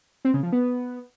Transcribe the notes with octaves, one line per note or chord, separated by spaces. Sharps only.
C4
C#3
F3
B3